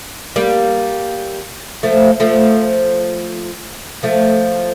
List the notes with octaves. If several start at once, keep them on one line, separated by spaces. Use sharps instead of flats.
G3 A#3
F3 A3
F3 A3
F3 A3